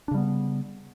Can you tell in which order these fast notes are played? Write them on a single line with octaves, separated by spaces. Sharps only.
D4 C#3 G3 B3